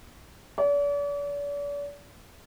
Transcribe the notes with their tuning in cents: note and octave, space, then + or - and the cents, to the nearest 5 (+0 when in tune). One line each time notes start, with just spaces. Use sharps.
D5 -40